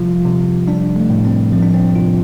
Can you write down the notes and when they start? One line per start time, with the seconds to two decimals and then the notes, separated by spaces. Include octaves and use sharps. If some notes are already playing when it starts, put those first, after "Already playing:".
Already playing: C3 F3 G3 F4
0.25 C3
0.67 G3 D4
0.96 A3
1.10 A2
1.25 C4
1.52 F3 C4
1.63 D4
1.74 C4
1.95 C3 F4